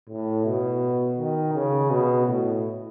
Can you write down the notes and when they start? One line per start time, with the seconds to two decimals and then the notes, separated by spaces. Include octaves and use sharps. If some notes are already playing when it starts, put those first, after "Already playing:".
0.10 A2
0.46 B2
1.18 D#3
1.54 C#3
1.90 B2
2.27 A2